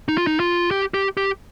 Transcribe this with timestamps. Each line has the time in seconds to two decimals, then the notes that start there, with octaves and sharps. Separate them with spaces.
0.08 D#4
0.18 F4
0.27 D#4
0.40 F4
0.71 G4
0.94 G4
1.17 G4